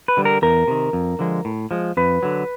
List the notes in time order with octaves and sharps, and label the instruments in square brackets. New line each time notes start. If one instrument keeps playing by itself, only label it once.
[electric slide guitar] B4
D3 G3
A#4
E2 A#4
C3 D#3
F2
D3 F3 G#3
A2
F3 G#3
F2 B4
D3 F#3